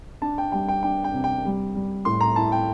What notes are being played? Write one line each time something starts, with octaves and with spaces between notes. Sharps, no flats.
D4 A5
G5
G3 G5
G5
D4 G5
G5
C3
G5
G3
G3
A2 C6
A#5
E4 A5
G5